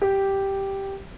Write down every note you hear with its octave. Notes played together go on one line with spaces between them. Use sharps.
G4